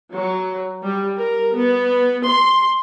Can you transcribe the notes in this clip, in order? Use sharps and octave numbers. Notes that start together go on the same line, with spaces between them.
F#3
G3
A#4
B3
C6